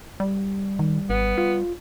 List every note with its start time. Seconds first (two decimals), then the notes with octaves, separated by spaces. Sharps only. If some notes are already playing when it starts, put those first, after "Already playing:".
0.20 G3
0.79 D#3
1.10 G#1 B3
1.38 F4